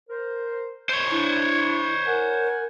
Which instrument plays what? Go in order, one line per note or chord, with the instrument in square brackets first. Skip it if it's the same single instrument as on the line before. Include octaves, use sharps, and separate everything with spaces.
[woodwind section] A#4 C5
[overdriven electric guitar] C5 C#5
[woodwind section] D4 [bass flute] E4
[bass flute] A#4 [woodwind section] F#5 G#5